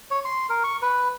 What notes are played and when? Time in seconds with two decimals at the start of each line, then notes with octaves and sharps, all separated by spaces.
0.11 C#5
0.25 C6
0.50 A#4
0.64 C#6
0.82 B4